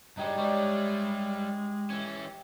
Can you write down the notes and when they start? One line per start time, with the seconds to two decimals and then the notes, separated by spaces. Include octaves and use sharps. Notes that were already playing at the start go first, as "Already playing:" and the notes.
0.17 G2 G#3 D#4 G4 D5
0.38 G3 G#3 D4 C#5 D5 E5
1.90 E3 C#4